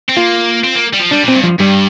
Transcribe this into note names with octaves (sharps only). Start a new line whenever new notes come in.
C4
A#3 F4
C4
A#3
G3
F3
G3 D4
A#2 C4
G2
F3
G2 G3